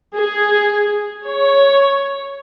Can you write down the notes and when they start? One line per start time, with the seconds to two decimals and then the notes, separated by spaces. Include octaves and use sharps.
0.14 G#4
1.25 C#5